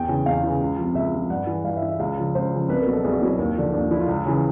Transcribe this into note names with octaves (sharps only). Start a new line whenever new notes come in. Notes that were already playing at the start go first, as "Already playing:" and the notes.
Already playing: E2 G5
C#3 E3
E2 F5
C#3 E3
C#2
C3 F3
C#2 E5
C3 F3
G2 F#5
E3
G2 F5
E5
E3
E5
C#2 F5
C#3 F3
C#2 C5
C#3 F3
C2 B4
A#4
B2 F#3
A4
C2 G#4
F#4
B2 F#3 E4
D#2
D3 F3
D#2 D4
D3 F3 E4
F4
C#2
C#3 E3